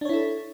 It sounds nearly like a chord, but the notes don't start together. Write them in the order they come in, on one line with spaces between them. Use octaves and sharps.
D4 C#5 E4 A4